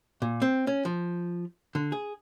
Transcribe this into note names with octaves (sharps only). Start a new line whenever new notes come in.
A#2
C4
C#4
F3
D3
G#4